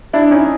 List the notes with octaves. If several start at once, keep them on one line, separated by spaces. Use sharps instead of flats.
D4 E4
C#4 D#4